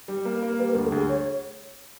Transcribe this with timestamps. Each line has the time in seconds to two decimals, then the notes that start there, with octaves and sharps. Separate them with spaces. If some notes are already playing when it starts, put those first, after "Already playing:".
0.08 G3
0.25 A#3
0.43 A#3
0.58 G3 B4
0.71 A#4
0.75 D2
0.84 A4
0.92 D2 G#4
1.09 C#5